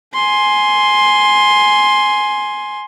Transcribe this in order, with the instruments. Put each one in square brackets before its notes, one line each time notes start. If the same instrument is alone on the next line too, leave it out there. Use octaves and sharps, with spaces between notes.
[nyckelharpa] G#5 C6